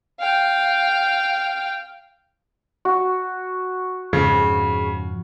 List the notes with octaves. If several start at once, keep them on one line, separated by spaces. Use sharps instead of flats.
F5 G5
F#4
F2 G#2 C#3 F3